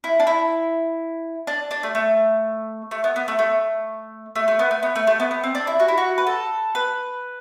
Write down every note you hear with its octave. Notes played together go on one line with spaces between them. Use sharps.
E4
D4
E4
D4
D4
A3
A3
A3
B3
B3
A3
A3
A3
A3
B3
A3
B3
A3
A3
B3
B3
C4
D4
E4
F#4
E4
F#4
B4
A4
B4